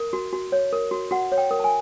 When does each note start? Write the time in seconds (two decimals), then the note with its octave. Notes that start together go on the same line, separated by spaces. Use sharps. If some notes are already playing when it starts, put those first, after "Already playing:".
Already playing: A#4
0.13 F#4
0.33 F#4
0.52 C#5
0.73 A#4
0.91 F#4
1.11 F#4 F#5
1.32 C#5
1.38 G5
1.51 A#4
1.60 A5
1.64 G#5